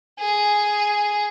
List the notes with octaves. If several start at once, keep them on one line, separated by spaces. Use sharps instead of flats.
G#4